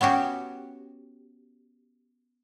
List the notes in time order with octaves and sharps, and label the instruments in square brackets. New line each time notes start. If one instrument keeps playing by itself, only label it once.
[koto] B3 C#4 F#4 G4